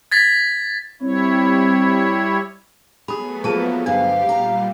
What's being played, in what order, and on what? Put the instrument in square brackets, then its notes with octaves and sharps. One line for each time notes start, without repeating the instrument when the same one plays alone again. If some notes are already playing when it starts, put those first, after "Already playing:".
[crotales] G#6 A6 B6
[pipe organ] G3 E4 C#5 [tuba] C4
[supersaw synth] F#3 A3 B3 [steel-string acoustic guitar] G#4 [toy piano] B5 D#6
[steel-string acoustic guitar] F3 A#3 [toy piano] G#4 A5
[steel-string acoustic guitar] D2 G2 G3 [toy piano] D4 [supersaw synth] G4 [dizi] F5
[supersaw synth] A#2 G3 [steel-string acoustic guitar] A#5